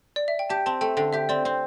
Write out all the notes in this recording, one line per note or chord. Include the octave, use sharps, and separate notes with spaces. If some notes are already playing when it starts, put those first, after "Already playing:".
D5
E5
G5
G4 A5
C4 A5
A3 G5
D3 G5
G4 E5
C4 D5
C4